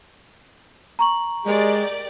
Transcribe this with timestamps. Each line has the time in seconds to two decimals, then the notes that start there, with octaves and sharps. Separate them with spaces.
0.99 A#5 C#6 F#7
1.45 G#3 G4 A#4 D5